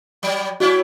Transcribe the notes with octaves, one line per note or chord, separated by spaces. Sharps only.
F#3 G3
G3 C#4 E4 F#4